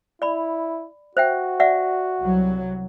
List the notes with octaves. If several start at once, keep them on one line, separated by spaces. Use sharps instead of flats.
E4 D5 B5
F#4 C5 E5 G5
D5 E5 F#5
C2 F#3